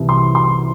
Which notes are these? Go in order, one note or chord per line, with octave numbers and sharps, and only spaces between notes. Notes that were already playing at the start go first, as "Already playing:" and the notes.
Already playing: C2 C3 E3
C6
C6